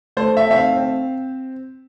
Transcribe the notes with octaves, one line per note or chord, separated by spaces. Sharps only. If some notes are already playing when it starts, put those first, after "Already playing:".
A3 C5
E5
C4 E5
F5
C4